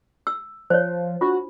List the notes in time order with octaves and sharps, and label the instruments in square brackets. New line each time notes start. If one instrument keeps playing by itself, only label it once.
[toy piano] E6
[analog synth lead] F3 [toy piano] C5 C#5
[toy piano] D4 F4 [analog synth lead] F#4